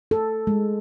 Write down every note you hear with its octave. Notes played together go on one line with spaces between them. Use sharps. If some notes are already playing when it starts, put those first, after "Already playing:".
A4
G#3